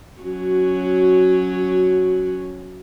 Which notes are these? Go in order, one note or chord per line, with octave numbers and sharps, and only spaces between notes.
F#3 C#4 F#4